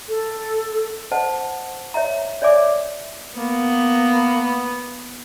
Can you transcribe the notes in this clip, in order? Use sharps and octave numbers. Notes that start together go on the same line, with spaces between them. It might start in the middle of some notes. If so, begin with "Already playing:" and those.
A4
C5 D#5 F#5 A5
C#5 D#5 E5 A#5
C#5 D5 E5 G#5 D6
A#3 B3